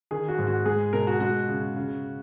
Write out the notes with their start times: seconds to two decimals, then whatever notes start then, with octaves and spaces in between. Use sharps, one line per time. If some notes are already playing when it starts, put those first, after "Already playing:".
0.11 D#3 G#4
0.28 F#4
0.39 G#2
0.47 F#4
0.66 G#3 G#4
0.93 B2 A#4
1.07 F#4
1.20 G#3 F#4
1.48 C#3
1.76 C#3